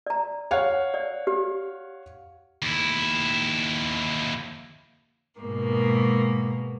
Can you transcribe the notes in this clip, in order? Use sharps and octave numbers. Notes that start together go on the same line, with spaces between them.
D5 A#5
C#5 F5 F#5
D5
G4
D#2 E4
G#2 B2 A#3